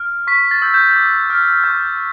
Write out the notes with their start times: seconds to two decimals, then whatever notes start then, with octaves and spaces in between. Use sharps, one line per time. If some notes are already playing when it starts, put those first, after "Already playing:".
Already playing: F6
0.27 C#6 B6
0.51 A6
0.62 E6 G6
0.74 G6
0.96 D6
1.30 F6
1.64 C#6 G6